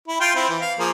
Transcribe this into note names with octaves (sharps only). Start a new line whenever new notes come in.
E4
F4 G5
C4 E4
E3
F5
F3 A#3 G#4